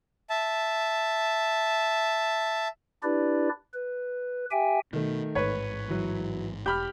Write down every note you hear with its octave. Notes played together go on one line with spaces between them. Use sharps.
E5 A5
D4 E4 G4 B4 D5
B4
G4 E5 G5 G#5
B2 D#3 A3
A1 G#2 B4 C#5
E3 F#3
E1 G4 B5 F6 G6